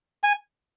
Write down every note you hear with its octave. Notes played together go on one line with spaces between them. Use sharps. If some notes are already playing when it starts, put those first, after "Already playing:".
G#5